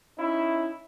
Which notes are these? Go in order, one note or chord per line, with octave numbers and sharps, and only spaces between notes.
C#4 D#4 E4